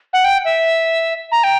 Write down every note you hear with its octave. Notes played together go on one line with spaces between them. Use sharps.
F#5
G5
E5
A#5
G5